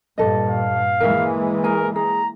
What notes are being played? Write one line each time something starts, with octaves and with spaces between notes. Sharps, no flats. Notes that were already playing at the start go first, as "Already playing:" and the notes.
G2 A#2 A4 D#5
F5
E3 G#3 A#3 A#4 E5
G#4 A#4 G#5
G#4 A#5